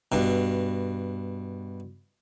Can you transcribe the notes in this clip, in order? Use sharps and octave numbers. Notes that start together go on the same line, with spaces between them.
G2 B2